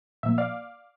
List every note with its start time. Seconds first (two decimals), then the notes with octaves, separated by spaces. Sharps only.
0.23 A#2 F3 A#3 E5
0.38 D5 F5